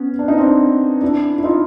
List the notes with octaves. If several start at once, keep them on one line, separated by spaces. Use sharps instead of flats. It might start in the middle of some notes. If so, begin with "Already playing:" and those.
Already playing: B3 C#4
D4
D#4
C4 D4
D4 E4
E4
D#4 F4